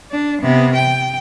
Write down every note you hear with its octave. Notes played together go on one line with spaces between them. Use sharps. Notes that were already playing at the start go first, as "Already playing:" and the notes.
D4
C3 B3
G5